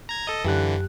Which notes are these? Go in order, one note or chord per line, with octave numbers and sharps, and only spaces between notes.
A#5 G#6
A4 D#5
F#2 D3 E3 G4 F#6